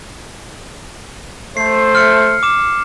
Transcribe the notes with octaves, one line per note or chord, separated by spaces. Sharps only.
A3 C5 C7
F6 C#7
D6 E7